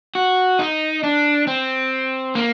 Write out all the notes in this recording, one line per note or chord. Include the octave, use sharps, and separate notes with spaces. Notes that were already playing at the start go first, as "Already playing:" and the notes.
F#4
D#4
D4
C4
A#3